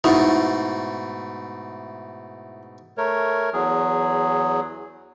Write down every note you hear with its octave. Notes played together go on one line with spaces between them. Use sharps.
G#2 B2 A3 D#4 E4
A3 A#4 C#5
E2 F#3 G#4